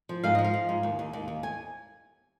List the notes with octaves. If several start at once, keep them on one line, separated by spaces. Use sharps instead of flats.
F3
G#2 F5
F3 D#5
F5
F3
G#2
D#2
D#2
D#2
D#2
G#5